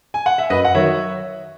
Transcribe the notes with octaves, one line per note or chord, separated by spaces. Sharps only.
G#5
F#5
E5
F#2 B4 D#5
F#5
D#3 F#3 C#5 E5